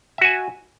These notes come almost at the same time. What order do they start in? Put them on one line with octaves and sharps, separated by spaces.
E5 F#4 G#5